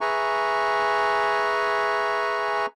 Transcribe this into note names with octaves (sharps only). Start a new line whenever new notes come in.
G#4 B4 E5 G#5 A#5 C#6